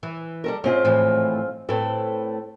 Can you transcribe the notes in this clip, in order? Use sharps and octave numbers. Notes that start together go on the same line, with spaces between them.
E3
G3 A4 A#4
G#2 C4 C#4 F4
A2 E3 F3
A2 C4 A4 B4